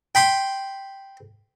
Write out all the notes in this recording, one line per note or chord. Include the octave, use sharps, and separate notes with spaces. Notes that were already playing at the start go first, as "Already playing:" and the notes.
G5 B5 C6